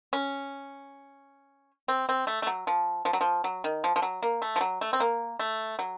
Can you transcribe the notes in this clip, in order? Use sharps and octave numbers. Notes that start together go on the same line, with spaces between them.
C#4
C4
C4
A3
A3
F#3
F3
F3
F#3
F3
F#3
D#3
F3
F3
F#3
A#3
A3
F3
F#3
A3
C4
A#3
A3
F#3